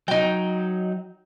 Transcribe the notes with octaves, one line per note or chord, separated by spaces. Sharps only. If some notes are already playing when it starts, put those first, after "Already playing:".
F#3 D#4 G5